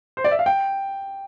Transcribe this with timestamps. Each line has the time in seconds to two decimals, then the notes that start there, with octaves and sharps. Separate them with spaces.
0.17 C5
0.24 D5
0.31 E5
0.39 F5
0.46 G5